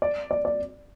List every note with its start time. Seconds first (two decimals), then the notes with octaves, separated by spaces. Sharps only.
0.02 D5
0.31 D5
0.45 D5